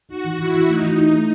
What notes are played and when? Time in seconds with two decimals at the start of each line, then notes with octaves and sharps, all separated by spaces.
0.09 D#4 F#4
0.24 E3
0.38 E3 E4
0.54 E3
0.68 A3 D#4
0.82 E3
0.98 E4
1.13 A3